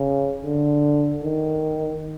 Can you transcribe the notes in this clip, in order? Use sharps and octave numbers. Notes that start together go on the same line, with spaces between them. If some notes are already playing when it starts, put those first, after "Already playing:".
Already playing: C#3
D3
D#3